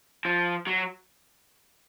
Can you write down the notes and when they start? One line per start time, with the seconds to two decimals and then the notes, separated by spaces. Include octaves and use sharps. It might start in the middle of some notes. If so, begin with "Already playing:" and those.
0.25 F3
0.67 F#3